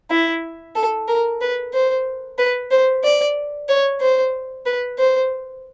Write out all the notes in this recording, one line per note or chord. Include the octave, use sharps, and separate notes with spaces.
E4
A4
A#4
B4
C5
B4
C5
D5
C#5
C5
B4
C5